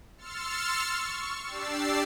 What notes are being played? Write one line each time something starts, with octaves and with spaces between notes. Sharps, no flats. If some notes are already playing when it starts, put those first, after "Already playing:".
C6 E6 F6 A6 C#7
C#6
D4 G4 D5 E6 A6 C7